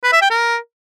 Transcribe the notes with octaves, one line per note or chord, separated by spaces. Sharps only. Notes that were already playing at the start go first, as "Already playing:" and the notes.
B4
E5
G5
A#4